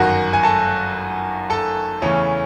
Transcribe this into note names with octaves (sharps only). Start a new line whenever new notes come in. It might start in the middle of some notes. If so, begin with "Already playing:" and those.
Already playing: G1 F#2 D#3 F#4 F#5
G#5
A4 A5
A4 A5
E2 C#3 E3 A3 C#4